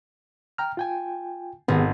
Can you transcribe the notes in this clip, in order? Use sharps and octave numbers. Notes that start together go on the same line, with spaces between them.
G5 A#5 F6
F4 G5 G#5
G#1 B3 G#4